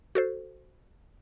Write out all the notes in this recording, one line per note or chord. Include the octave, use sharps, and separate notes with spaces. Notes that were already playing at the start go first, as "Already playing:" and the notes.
F#4 A4 C5